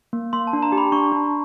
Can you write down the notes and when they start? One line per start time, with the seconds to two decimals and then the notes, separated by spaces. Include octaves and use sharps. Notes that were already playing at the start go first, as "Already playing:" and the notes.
0.13 A#3
0.33 A#3 C6
0.47 A5
0.53 D4
0.62 A#5
0.72 G4
0.78 B5
0.92 D4 C#6
1.12 D4